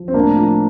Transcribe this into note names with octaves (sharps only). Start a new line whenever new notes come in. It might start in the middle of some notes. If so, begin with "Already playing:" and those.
Already playing: F3
C4
A2 A#3 D4
F3